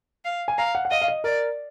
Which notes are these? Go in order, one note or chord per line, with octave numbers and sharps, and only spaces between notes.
F5
G#5
F5 A#5
F#5
F#5
D#5 F5
F5
D#5
A#4 D5